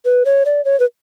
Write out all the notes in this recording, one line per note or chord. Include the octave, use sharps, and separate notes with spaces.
B4
C#5
D5
C#5
B4